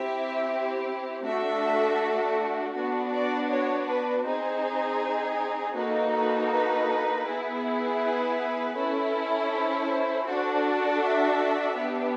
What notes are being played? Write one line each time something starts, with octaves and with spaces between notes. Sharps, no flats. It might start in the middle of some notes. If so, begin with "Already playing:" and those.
Already playing: C4 E4 G4 E5
A3 D4 F#4 A4 E5
B3 D4 F#4
D5
C#5
B4
C4 D#4 G#4 C5
A#3 D#4 F#4 A4 B4
B4
B4
B3 E4 G#4
B4
C#4 E4 A4
C5
D4 F#4 A4
E5
B3 D4 G4